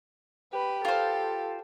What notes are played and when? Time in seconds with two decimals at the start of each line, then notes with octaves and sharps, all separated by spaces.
0.54 G4 B4
0.85 F4 A4 C5